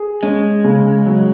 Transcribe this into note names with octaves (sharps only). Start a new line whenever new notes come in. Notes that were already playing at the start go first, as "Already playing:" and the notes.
Already playing: G#4
G#3 C#4
C#3
F#3